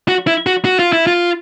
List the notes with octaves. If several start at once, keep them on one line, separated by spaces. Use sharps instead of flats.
F#4
E4
F#4
F#4
F4
E4
F4